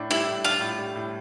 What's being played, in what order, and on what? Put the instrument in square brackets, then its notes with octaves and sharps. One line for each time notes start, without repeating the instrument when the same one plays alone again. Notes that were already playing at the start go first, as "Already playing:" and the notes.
Already playing: [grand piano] A2 D4
[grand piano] G3 [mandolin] E4
[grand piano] A2
[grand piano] D4 [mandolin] F4
[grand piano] A2
G3
A2